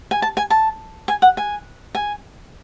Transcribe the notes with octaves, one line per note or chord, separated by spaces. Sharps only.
G#5
A5
G#5
A5
G#5
F#5
G#5
G#5